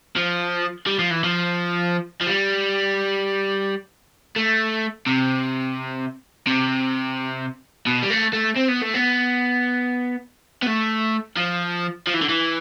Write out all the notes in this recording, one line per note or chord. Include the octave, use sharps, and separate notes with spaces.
F3
G3
F3
E3
F3
F3
G3
A3
C3
C3
B2
G3
A3
A3
C4
B3
A3
B3
B3
A3
F3
F3
E3
D3
E3